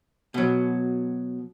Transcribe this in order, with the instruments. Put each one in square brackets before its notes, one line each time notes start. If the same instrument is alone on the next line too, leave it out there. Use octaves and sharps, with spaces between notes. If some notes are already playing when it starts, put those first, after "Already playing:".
[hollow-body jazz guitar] B2 F#3